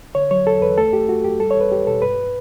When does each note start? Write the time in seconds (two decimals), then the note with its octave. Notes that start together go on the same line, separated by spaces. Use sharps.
0.15 D3 C#5
0.31 F#3 C#5
0.46 E2 A4
0.62 E2 B4
0.78 A3 A4
0.93 A3 G4
1.08 A3 F#4
1.24 F#2 G4
1.40 G3 A4
1.51 C#5
1.56 E2 B4
1.71 E2 G4
1.86 B2 A4
2.02 G2 B4